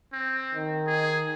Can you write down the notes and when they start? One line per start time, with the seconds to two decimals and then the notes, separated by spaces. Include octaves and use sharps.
0.13 C4
0.55 D#3
0.87 G#4